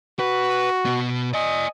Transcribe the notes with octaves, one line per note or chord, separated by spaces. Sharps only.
F#4 B4
B2 B3
D5 D#5 G#5